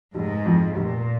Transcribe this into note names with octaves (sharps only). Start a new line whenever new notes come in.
F1 G#2
F2 F3
F1 A#2